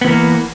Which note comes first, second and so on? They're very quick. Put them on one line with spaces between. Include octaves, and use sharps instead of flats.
B3 E3 A#3